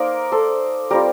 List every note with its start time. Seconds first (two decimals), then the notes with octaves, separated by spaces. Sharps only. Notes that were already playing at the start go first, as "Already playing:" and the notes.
Already playing: A#3 D#4 A#4 C5 D5
0.32 A4 C5
0.91 G3 C4 F4 G4 A#4